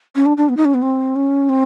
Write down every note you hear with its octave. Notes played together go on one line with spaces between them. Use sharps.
C#4
D4
D4
B3
D#4
C#4
B3
C4
C#4
C4